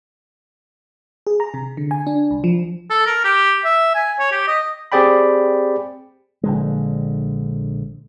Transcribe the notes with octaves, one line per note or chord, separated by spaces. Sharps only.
G#4
A#5
C3
D3
G#5
D4
C2
F3
A4
A#4
G4
E5
G#5
C#5
G4
D#5
C4 G4 G#4 D5 G5 B5
A#1 D3 G#3